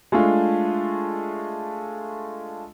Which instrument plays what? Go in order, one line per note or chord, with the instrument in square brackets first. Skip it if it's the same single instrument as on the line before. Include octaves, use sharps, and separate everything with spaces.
[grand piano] G#3 A3 D4 F4